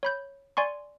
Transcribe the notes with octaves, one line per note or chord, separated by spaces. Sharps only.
C#5 B5 G6
D5 G#5 C6 C#6